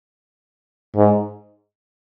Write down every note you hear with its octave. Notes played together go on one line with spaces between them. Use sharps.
G#2